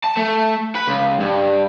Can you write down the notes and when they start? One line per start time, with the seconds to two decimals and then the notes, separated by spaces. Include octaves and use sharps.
0.04 A5
0.17 A3
0.75 B4
0.87 C#2
1.21 G2